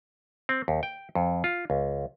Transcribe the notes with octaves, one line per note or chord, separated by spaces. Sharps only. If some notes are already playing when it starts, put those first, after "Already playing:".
C4
D#2
G5
F2
F4
C#2